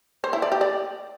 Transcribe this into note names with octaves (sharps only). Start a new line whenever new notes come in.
C5
E4
D5
G4
D5